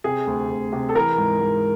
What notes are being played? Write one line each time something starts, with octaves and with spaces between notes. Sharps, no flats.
C3 G#4
D2
D2
C3
A4
E3 A#4
G#2
G#2